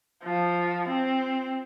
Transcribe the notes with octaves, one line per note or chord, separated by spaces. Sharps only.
F3
C4